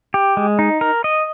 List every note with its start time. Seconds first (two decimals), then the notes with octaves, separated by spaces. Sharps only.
0.14 G4
0.37 G#3
0.59 D#4
0.81 A#4
1.04 D#5